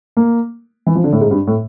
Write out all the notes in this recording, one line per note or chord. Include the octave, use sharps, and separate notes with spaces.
A#3
E3
F3
D3
A2
G#2
G2
A2